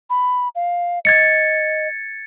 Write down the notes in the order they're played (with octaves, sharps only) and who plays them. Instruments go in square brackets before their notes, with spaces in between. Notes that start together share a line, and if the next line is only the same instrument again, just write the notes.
[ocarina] B5
F5
[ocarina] D#5 [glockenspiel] G#6 A6 C#7